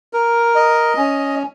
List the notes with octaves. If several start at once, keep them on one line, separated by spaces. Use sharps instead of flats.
A#4
D#5
C#4